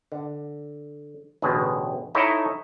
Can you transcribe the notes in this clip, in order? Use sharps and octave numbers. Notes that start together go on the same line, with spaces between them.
D3
A1 D2 B2 G#4
D#4 E4 A4 C#5 D#5